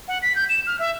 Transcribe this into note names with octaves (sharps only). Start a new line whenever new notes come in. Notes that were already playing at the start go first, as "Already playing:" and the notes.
F#5
B6
G6
E7
F6
E5